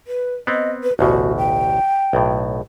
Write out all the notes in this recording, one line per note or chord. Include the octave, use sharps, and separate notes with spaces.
B4
B3 C4 D#5
B4
A1 D2 B2 F#4
G5
B1 A2